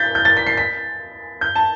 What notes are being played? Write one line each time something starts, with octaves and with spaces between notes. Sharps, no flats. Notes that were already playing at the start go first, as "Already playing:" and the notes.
Already playing: G6 A6 B6
G6
A6
B6
C7
B6
G6
A5